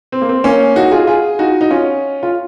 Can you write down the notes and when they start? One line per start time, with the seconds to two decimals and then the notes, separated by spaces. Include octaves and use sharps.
0.12 C4
0.22 A#3
0.29 C4
0.44 A#3 C#4
0.76 D#4 F#4
0.91 F4 G#4
1.07 F4 G#4
1.39 D#4 F#4
1.61 D#4
1.70 C#4 F4
2.23 F4